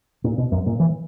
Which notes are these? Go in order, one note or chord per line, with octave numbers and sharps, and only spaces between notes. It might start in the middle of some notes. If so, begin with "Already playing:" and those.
A#2
B2
F#2
A#2
E3